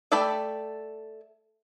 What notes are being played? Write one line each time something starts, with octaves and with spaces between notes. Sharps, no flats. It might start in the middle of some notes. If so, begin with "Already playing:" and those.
A3 A4 D5 G5 B5